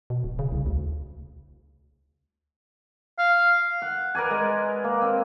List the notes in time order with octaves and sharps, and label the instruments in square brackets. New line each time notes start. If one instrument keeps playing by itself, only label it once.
[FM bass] B2
D1
C#3
C2
D2
[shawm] F5
[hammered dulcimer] F#5
A#4 B4 D5 G#5
G#3
A#3
C4